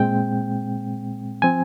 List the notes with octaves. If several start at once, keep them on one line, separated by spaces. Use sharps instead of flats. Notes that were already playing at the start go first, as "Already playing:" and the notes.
Already playing: A#2 G#3 C4 G5
F3 C4 G#5